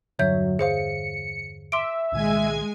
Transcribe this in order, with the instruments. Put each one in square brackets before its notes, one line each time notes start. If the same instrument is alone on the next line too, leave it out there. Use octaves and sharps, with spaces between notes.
[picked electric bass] E2 G2 D3 [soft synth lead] F#3 [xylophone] C#5 E5 G6
[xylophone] G#4 C5 F5 [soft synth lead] C#7
[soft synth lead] E5 [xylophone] C6 D6 D7
[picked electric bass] C2 A#2 D#3 [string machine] G#3 G#5 G#6